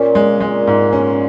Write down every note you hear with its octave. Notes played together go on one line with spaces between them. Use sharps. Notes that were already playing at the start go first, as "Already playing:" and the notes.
Already playing: A#2 C#4
G#3
G#3
G#2
C#4